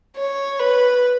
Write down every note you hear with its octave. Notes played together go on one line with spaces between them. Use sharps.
C#5
B4